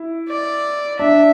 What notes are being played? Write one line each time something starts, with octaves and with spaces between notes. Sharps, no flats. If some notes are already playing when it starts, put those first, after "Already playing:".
Already playing: E4
D5
D4 E5